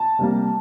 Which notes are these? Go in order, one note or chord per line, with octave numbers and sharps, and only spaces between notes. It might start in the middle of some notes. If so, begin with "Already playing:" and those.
Already playing: A5
C3 G3 A#3